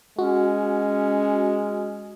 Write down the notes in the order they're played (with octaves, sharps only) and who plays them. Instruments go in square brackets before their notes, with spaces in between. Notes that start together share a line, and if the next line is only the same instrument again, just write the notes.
[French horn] G#3 [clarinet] C#4 [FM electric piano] F#4